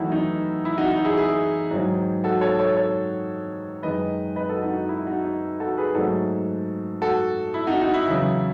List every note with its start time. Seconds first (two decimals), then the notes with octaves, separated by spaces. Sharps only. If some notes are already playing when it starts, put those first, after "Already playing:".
Already playing: E2 D#3 F#3 A3 D#4 E4 F#4
0.12 D#4
0.65 E4
0.78 D#4 F#4
0.91 D#4 F#4
1.05 E4 G#4
1.17 E4 G#4
1.71 G#2 D#3 F#3
2.24 F#4 A4
2.41 A4 C#5
2.59 A4 C#5
2.77 A4 C#5
3.83 F#2 D#3 G#3 B4 D#5
4.36 B4 D#5
4.49 F#4 A4
4.62 D#4 F#4
4.76 D#4
4.89 E4
5.07 D#4 F#4
5.24 D#4
5.60 F#4 A4
5.77 G#4 B4
5.95 G#2 F#3 A3 F#4 A4
7.02 F#4 A4
7.54 E4
7.67 D#4 F#4
7.81 D#4 F#4
7.94 E4
8.07 E2 C#3 F#3 E4